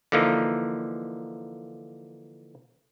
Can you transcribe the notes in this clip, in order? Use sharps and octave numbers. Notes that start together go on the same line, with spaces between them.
D3 E3 F3 A#3 D#4